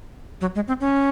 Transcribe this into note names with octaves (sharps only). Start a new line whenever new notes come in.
F#3
G#3
C4
C#4